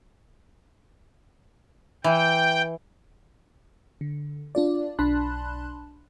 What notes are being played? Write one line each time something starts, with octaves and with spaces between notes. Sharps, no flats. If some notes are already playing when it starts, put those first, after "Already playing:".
E3 G5
D3
D4 F4 D5
B1 D4 A5 B5 C6 F#6